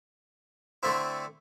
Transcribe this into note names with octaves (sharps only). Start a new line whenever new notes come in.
D3 A3 C4 E4